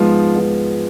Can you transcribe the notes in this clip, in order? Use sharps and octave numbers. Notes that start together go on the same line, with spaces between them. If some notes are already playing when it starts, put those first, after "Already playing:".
Already playing: G#2 F3 G#3 B3
G#2 F3 G#3 B3